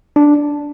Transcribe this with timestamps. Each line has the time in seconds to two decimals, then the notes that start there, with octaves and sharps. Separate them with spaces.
0.16 D4